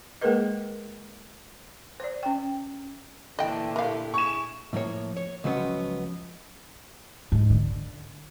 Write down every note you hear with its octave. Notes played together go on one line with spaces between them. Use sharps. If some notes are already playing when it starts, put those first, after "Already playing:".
G#3 A#3 G#4 A#4 B4 D#5
C5 D5
C#4 G5
A#2 D3 E3 A3 D4 D#5 G5
E4 G4 A#4 F5
E4 G#4 C#6 E7
A2 F3 A#3 C#5
C#5
C#2 F3 F#3 B3 C#4
G#2
D3